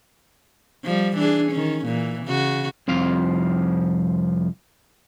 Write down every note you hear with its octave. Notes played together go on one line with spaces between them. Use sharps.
F3 G3
E3 D4 G#4
D#3 C#4
A#2 E3
C#3 F#4
C2 F2 F3 F5